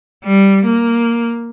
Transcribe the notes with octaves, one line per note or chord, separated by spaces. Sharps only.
G3
A#3